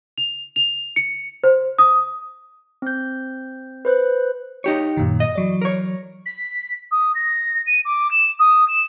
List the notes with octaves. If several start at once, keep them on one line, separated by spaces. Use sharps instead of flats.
F7
F7
C#7
C5
D#6
C4 G6
B4 C5 F#6
D#4 G4 C#5
F#2 A#2 D#3
D#5
E3 F#3 D5
A#4 C#5
B6
D#6
A#6
D#7
D6
E7
D#6
E7